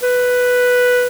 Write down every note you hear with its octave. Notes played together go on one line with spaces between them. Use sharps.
B4